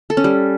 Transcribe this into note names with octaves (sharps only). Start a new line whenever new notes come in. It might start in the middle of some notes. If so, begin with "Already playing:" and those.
A4
C#4
G3